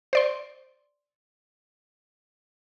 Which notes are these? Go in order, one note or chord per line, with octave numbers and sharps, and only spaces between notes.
C5 D5 C6